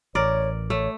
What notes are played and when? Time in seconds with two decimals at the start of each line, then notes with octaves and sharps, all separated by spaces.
0.15 A1 A#4 C#5 D5
0.70 A3 C#5